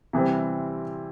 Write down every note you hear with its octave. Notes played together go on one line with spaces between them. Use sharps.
C3 E3 G3 C4